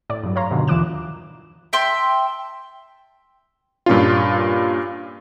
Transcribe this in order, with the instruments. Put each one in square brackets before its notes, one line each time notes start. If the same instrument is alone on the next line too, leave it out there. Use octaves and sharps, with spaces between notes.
[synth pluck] A2 D5
G2 F#3
C#5 F5 A#5 C6
G2 B2 D3 D#3
D#2 E3 F4 D6 F#6 E7
[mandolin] E5 G5 A5 C6
[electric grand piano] G2 A#2 C#4 F4